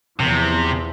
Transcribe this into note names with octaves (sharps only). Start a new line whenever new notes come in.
E2 C3 F3